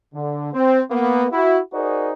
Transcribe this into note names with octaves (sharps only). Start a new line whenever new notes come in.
D3
C4
A#3 B3
E4 F#4
D#4 F#4 G#4 A#4 C5 D5